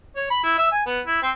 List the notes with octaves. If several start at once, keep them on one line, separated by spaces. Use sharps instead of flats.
C#5
B5
E4
E5
G#5
B3
E4
C4